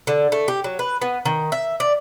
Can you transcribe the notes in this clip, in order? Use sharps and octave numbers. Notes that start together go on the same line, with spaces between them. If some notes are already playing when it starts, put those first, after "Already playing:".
D3
A3
G4
F#3
B4
B3
D#3
E5
D5